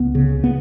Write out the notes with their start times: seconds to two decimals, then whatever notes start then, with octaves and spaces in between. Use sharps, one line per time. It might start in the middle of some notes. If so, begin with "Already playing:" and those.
Already playing: C#2 B3
0.15 C#3
0.44 B3